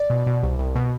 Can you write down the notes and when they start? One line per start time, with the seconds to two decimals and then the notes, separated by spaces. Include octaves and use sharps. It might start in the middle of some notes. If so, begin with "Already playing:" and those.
Already playing: D5
0.10 B2
0.27 B2
0.43 C2
0.59 C2
0.75 B2